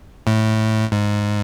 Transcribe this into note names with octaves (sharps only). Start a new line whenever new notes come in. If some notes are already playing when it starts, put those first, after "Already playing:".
A2
G#2